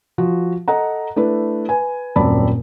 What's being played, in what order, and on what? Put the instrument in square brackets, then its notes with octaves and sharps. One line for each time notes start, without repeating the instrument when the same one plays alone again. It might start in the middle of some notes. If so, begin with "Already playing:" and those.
[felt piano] F3 F#4
A4 D#5 F#5 A#5
A3 D4 E4 B4
B4 G#5
D#1 F#2 C4 D5 A5 B5